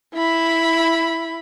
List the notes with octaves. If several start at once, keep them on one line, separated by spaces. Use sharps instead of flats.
E4 B5